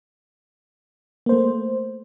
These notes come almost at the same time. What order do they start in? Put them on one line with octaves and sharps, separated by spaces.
A#3 C5 A3